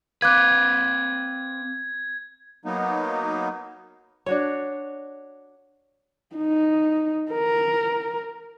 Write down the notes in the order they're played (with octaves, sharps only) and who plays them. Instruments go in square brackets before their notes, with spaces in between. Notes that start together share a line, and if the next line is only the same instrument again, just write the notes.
[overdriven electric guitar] C4 B4 [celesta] F5 D6 F#6 [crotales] G#6
[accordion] F#3 A#3 B3 D#4
[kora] D4 F#4 C#5
[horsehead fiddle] D#4
A#4